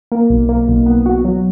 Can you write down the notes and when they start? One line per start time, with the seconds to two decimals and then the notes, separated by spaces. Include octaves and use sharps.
0.12 A#3
0.30 B1
0.49 A#3
0.68 B1
0.86 B3
1.06 F#4
1.25 F#3